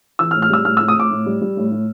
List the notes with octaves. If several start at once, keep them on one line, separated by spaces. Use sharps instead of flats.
E3 E6
F6
A2
F6
G3 E6
A2 F6
E6
A2
D#6
A2 D6
A2
G3
G3
A2
A2